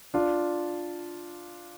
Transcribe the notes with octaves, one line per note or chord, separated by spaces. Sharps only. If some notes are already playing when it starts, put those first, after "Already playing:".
D4 F4